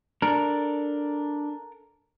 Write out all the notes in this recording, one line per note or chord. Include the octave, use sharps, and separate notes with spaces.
D4 A4 A#4